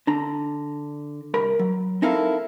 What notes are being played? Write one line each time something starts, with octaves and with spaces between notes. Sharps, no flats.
D3 D4 A#5
C2 A#4 B5
F#3
C4 D#4 E4 A4 A#4 F5